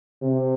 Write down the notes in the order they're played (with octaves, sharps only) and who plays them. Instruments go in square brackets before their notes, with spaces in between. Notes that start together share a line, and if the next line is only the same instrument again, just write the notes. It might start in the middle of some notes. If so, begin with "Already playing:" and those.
[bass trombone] C3